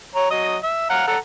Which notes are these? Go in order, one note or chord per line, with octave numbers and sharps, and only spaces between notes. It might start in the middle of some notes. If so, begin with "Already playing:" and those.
C#5 A#5
F#3 D#5 D#6
E5
F5 F#5 A#5
A4 F#5 A#5